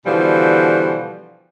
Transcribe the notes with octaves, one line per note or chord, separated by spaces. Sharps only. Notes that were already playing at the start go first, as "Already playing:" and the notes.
B2 D3 E3 F3 G3